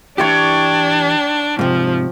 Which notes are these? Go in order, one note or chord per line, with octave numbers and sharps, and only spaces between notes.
E3 D4 E4 G4 C#5 D5 G5
G#2 C3 F3